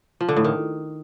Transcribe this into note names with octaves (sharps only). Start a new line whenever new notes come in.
F3
D3
A2
D#3